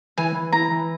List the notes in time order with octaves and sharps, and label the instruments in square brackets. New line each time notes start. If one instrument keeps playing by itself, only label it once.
[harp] E3 [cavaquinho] G#5
[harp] E3
[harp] E4 [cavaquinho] A#5
[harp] E3